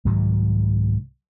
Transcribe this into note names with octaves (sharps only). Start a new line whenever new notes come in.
C2 G#2 D#3 F#3